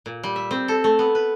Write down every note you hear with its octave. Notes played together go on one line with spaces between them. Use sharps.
A#2
G3
E5
C4
A4
A3
B3
B4